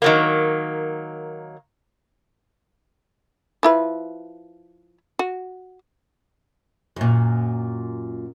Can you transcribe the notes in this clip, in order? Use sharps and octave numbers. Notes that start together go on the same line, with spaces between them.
D#3 F#3 A#3
F3 E4 B4
F#4
F#2 A#2